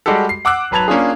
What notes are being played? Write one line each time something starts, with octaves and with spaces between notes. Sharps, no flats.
G3 G#3 F#4 G4 A4
C7
F#5 D6 E6 F#6
G#1 F#3 B4 A5 G#6 F7
A#3 C#4 D4 F4 G#4